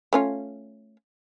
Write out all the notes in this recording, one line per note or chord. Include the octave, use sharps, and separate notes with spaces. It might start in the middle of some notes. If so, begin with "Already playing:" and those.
A3 C#4 F4